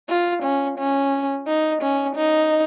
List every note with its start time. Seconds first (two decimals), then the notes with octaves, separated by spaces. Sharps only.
0.09 F4
0.43 C#4
0.78 C#4
1.47 D#4
1.82 C#4
2.16 D#4